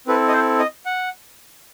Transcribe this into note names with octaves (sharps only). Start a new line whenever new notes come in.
C4 E4 A4 B4
D#5
C5
D#5
F#5